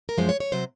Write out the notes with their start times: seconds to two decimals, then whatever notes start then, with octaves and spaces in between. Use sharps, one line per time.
0.09 A#4
0.18 F#2 F3 G#3 C5
0.29 C#5
0.40 C#5
0.52 C3 F#3 C5